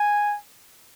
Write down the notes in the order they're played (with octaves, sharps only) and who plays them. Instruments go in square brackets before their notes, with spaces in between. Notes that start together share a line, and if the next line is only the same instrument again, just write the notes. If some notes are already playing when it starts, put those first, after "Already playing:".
Already playing: [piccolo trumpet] G#5